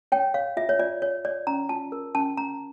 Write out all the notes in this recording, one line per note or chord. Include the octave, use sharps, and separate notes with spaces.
C#5 G5
C#5 F5
F4 E5
C#5
F4 D5
C#5
C#5 D5
C#4 A#5
F4 A5
A#4
C#4 A5
C#4 A#5